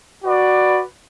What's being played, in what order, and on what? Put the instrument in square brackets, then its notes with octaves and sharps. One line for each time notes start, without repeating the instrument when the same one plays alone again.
[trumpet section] F#4 B4 D5